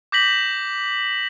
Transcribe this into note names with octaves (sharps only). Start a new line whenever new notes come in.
D6 G6 A#6 B6 F#7